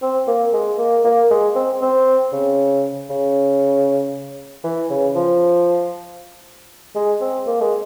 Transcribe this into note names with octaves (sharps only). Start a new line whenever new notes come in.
C4
A#3
G#3
A#3
A#3
G#3
C4
C4
C#3
C#3
E3
C#3
F3
G#3
C4
A#3
G#3